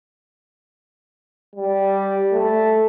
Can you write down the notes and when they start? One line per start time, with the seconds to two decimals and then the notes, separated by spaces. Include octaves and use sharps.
1.56 G3
2.33 A3